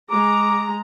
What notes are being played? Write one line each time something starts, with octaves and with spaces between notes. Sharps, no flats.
G#3 A#5 D6